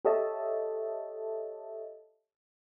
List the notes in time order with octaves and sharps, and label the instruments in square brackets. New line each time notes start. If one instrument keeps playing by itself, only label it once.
[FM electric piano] G4 A4 C#5 D#5 E5 A5